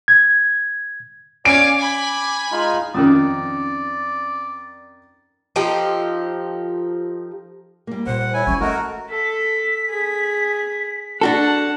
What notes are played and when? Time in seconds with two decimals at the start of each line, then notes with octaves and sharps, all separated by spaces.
0.08 G#6
1.45 C#4 D5 F5 G#5 D7
1.78 G#5 B5 D6
2.52 G#3 D#4 F4
2.94 F2 D#3 C#4 D5 A#5 D#6
5.56 F3 D#4 G4 A4
7.87 G3 A#3
8.06 A#2 C5 F#5
8.20 C5
8.34 E4 C#5 G#5
8.47 G#3 C#4 C#6
8.60 A3 F#4 A#4 D#5
9.09 A4 B6
9.90 G#4
11.21 D4 F#4 A4 F#5 A5